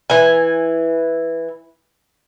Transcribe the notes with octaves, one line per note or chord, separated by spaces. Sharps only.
E3 G#5